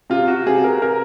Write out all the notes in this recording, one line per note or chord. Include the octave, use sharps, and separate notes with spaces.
C3 F4
F#4
C3 G#4
A#4
A#4